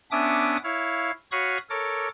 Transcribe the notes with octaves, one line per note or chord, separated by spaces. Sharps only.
B3 C#4 D4 E5 D6 D#6
E4 C#5 F5
F#4 C#5 F5 B5 C#6 D#6
A4 A#4 C#5 D6